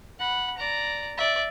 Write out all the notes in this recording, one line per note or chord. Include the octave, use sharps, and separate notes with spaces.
F#5 B5
D5 A#5
D5 E5